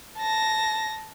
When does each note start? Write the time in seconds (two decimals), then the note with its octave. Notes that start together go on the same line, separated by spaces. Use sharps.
0.18 A5 A#6